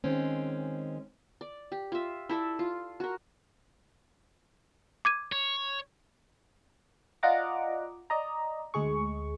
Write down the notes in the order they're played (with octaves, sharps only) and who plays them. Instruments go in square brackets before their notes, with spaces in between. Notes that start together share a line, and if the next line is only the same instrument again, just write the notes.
[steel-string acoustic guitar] D#3 G#3 C4 C#4
[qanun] D5
G4
F4 E5
E4 A4 D5 E5
F4
F#4 A#4
[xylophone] D6 G#6 D#7
[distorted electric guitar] C#5
[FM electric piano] F4 D5 D#5 F#5 A#5 D6
D5 D#5 A#5
D2 G#3 G#4 C#6